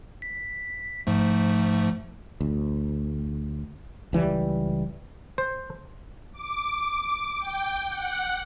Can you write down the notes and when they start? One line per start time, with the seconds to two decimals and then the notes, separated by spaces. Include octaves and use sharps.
0.22 B6
1.07 G#2 F3 A3
2.41 D2
4.13 C#2 E3 F#3 G3
5.38 C5
6.33 D6
7.40 G5
7.89 F#5